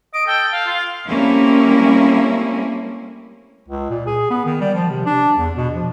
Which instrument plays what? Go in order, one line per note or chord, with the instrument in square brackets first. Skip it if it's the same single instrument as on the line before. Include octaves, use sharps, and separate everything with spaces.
[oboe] D#5 [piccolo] D7
[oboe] A4 [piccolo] G5
[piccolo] F5
[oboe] F4
[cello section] G3 A3 A#3 C4 C#4 E4
[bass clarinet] C#2
A#2
G#4
B3
D#3
G3
F3
C3
D4
E2
B2
F3